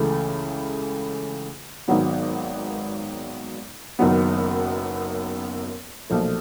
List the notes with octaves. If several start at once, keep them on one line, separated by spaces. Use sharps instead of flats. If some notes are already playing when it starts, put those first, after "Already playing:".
Already playing: C#2 C#3 E3 A3
G#1 G#2 D#3 F#3 B3
F#1 F#2 D#3 F#3 B3
B1 A#2 F3 A3